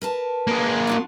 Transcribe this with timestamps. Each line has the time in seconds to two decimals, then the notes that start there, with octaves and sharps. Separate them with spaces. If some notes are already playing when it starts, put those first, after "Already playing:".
0.02 A#4 B4 A5
0.47 A#3 G#4
0.87 D4 F4 F#4